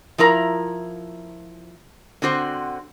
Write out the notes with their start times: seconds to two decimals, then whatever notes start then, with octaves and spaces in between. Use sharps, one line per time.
0.18 F3 E4 A#4 A#5
2.22 D3 C4 F#4 C5